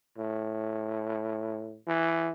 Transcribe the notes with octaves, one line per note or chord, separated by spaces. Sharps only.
A2
E3